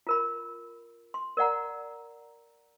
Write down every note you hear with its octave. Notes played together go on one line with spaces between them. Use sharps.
F4 A#4 B5
C6
A#4 D5 F#5 A#5